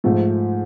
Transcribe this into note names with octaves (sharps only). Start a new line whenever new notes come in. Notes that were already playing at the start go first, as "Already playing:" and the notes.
G#2 F3 A3